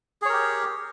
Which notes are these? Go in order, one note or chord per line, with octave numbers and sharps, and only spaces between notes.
G4 G#4 A#4 C#5